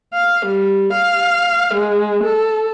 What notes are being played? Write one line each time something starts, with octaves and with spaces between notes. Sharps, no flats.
F5
G3
F5
G#3
A4